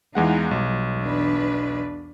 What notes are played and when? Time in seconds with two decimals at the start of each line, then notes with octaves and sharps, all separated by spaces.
0.15 E2 E3 G#3 D#4 F4 F#5
0.51 B1 F#3 G3
0.98 E2 D4 B4